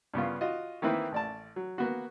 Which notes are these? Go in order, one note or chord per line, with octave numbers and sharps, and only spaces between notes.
G2 C#3 B3 F4
F4 F#4 D#5
D#3 E3 A#3 C4 E4 B4
A1 D5 A5
F#3
A#3 B3 F#4